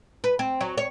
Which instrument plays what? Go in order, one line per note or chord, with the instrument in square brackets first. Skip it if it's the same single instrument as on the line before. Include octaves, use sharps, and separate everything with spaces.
[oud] B4
C4
F#3
C#5